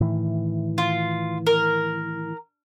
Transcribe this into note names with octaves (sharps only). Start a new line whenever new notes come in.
A2 D#3 E3
F4
A#4